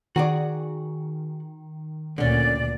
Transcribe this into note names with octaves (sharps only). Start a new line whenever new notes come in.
D#3 F#4 G#4 D5
D2 A#2 D3 C#4 D5